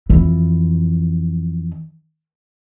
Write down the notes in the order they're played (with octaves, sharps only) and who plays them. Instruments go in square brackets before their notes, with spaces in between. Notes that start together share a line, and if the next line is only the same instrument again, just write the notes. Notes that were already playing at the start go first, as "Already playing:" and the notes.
[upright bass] F2 E3